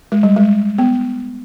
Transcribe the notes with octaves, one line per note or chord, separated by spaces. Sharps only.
G#3
G3
G#3
B3